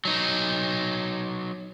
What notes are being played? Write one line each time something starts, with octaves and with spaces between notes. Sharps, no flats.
F#3 D#4